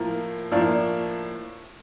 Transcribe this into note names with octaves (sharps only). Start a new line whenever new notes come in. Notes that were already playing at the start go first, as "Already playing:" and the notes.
Already playing: A2 F3 A#3
A2 F3 A#3 D4